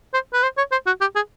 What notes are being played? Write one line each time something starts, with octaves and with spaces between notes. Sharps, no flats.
C5
B4
C5
C#5
C5
F#4
G4
G#4